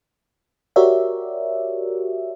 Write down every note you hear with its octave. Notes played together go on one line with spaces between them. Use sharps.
F#4 G4 A#4 C#5 D5 E5